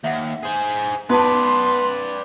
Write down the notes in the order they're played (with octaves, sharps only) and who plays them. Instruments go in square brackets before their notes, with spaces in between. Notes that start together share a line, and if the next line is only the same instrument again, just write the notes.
[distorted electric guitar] D#2 [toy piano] E5 F#5
[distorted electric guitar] G#4 C5
[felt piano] B3 [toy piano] D#4 A5 [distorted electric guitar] B4 D5 [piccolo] C6